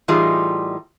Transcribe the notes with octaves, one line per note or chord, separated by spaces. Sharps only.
A2 E3 G3 D#4 F4 G#4